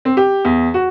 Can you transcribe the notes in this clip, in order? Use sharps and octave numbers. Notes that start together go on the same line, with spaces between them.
C4
G4
E2
F#4